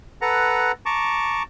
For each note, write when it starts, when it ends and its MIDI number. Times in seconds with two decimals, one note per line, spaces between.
0.22 0.72 69
0.22 0.72 71
0.22 0.72 78
0.22 0.72 82
0.86 1.43 81
0.86 1.43 82
0.86 1.43 85
0.86 1.43 86